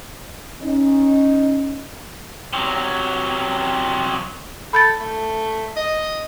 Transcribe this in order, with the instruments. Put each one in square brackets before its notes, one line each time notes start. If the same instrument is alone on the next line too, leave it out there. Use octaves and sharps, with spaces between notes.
[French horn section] C#4 D#4
[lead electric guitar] C3 F#3
[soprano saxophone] A4 [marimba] B5 G6 A6
[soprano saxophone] A3
D#5